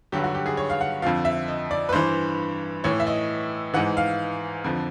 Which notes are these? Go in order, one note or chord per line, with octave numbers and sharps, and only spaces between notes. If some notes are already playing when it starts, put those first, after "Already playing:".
G2 D3 F#3 G4
F#4
G4
G#4
C#5
F5
F#5
F2 D3 F3 F5
E5
D#5
D5
B4
G2 E3 C5
A2 E3 C#5
E5
D#5
G#2 E3 F#5
F5
F2 D3 F3